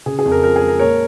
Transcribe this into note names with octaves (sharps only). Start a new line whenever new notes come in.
C#3 G#4
G#4
F2
A#4
F3 A#4
G#4
G#3
A#4
A#2 A#4 C#5